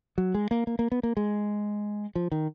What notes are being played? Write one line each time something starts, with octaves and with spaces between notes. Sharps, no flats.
F#3
G#3
A#3
A#3
A#3
B3
A#3
G#3
F3
D#3